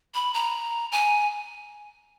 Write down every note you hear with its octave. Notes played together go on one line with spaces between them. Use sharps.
B5
A#5
G#5